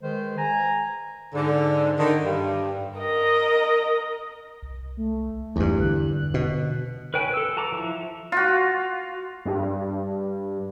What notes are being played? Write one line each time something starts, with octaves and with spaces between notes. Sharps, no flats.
D#3 G#3 G#4 B4 C5
G#5 A#5
G#2 D3
D3 D#3
G2
A#4 D#5
C2
A3
B1 E2 G2
D3 F#6
B2
B4 C#5 G5 G#5
A4 E6
F#4 A5 A#5 D6
F3 E4
F4 F#4
G2